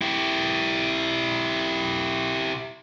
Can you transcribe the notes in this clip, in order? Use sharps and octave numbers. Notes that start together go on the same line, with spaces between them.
E4 G4